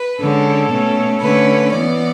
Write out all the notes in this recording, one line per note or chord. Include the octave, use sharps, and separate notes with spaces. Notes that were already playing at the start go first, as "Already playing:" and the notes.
Already playing: B4
D3 G#3 C#4 A4
B2 A3 C#4
D3 A3 C#4 B4
E3 B3 D5